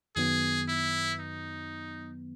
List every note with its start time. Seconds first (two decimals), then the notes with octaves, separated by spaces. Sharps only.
0.16 F#2 D#3 F#3 B3 G#4
0.68 E4
1.20 D#4